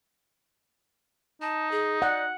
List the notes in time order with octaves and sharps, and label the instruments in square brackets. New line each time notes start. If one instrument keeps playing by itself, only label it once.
[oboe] D#4 [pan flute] A5
[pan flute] G#4
[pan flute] D5 [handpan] F#5